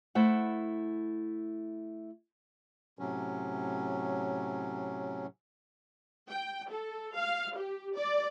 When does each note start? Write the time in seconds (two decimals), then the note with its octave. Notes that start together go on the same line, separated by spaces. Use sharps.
0.15 A3 E4 C5 F#5
2.99 A2 C3 F#3 C#4
6.29 G5
6.70 A4
7.15 F5
7.56 G4
7.96 D5